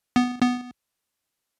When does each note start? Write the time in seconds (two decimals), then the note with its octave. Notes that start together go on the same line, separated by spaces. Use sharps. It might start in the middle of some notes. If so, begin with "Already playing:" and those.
0.16 B3
0.42 B3